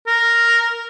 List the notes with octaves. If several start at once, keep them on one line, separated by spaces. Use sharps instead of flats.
A#4